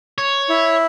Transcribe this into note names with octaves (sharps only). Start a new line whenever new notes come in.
C#5
E4